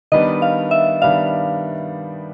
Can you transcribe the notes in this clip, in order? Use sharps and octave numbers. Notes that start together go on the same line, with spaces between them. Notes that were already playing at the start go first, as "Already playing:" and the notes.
D#3 G3 B3 D4 D#5
F5
E5
D#3 G3 B3 D4 F5